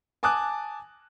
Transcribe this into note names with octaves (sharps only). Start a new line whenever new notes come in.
G#5 A5 D6 D#6 F#6